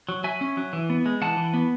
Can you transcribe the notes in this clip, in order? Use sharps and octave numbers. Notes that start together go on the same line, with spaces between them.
F#3
F#3 E5 G#5
C#4
F#3
E3
B3
G#3
E3 F#5 A5
E3
B3